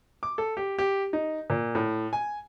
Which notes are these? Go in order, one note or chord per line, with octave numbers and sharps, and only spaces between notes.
D6
A4
G4
G4
D#4
A#2
A2
G#5